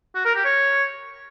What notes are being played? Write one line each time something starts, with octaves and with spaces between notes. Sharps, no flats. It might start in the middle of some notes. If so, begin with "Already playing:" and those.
F#4
A#4
G4
C#5